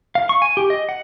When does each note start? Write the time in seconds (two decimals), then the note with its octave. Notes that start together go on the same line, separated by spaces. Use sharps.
0.15 F5
0.29 C#6
0.42 G#5
0.57 G4
0.70 D#5
0.89 F#5